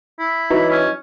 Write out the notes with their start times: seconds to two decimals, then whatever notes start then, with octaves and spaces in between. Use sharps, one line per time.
0.19 E4
0.50 E3 F#3 D#4
0.71 C#4